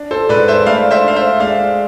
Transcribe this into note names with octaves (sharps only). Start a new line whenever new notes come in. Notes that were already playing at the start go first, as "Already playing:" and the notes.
Already playing: D4
A4 C5
G#2 B4 D5
C5 E5
A3 D5 F5
C5 E5
D4 F5
C5 E5
G#3 D5 F5